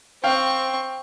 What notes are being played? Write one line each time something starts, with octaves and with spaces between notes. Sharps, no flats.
C4 F5 G5 C#6